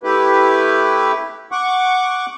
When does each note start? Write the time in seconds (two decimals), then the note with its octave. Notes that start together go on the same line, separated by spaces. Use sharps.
0.03 A3 E4 G4 B4
1.52 F#5 C#6 D6